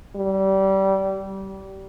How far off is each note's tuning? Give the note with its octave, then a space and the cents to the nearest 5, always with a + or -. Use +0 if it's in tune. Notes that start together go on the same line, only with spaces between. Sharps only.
G3 -25